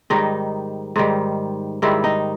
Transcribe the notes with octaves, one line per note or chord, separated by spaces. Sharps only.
G#2 D#3 G3 D#4
G#2 D#3 G3
G#2 D#3 G3 E4
D#4